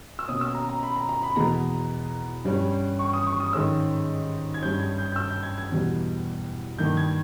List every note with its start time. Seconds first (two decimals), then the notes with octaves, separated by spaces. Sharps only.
0.19 E6
0.28 B2 A#3 C#4 D#6
0.41 E6
0.55 A#5
0.69 A#5
0.83 B5
0.96 A#5
1.09 A#5
1.23 B5
1.36 E2 B2 G#3 B3 A#5
2.45 G2 G3 C#4
2.99 C#6
3.13 D#6
3.27 C#6
3.40 D#6
3.53 G#2 D#3 G#3 C#4 E6
4.54 G#6
4.62 G2 G3 C#4 G6
4.80 G#6
4.98 G6
5.12 G6
5.16 E6
5.31 G6
5.43 G#6
5.58 G#6
5.71 E2 B2 G3
6.78 G2 D#3 A#3 G6
6.97 G#6